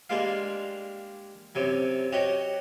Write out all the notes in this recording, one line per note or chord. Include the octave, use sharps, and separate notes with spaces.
G3 G#3 A#3 D4 F4 F5
F#2 C3 F#3
F#4 G4 C#5 D#5 G5